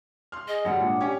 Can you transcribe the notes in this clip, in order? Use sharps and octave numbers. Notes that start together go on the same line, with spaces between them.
C6 F6
G#4 D#5
F#2 G3 F#5
A#2 G#3 D4
C#4 G4